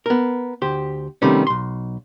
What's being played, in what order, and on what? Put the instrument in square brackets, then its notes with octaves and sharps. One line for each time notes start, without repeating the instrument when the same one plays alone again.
[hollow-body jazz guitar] B3 A#4
D2 G4 C5
C3 D#3 G3 A3 B3 C#4
B1 C6